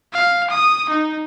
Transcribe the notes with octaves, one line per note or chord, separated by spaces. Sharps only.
F5
D#6
D#4